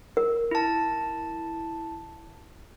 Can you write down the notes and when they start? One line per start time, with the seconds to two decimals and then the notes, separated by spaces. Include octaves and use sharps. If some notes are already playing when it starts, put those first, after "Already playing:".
0.17 A#4
0.51 E4 A5